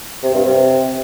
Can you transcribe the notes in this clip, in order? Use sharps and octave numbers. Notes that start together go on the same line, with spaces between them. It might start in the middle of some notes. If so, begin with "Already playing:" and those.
C3
G2
C3